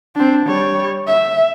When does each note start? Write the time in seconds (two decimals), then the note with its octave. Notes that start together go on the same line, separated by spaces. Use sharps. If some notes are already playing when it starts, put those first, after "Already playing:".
0.15 C4 D4
0.46 G3 C#5
1.07 E5